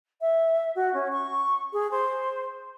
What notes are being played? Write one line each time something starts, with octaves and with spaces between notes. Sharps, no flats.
E5
F#4
C#4
C#6
G#4
C5